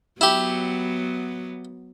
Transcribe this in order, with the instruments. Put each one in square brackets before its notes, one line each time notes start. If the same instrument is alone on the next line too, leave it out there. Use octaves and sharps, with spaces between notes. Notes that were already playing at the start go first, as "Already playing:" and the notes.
[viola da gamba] F#3 B3 [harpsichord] E4 G4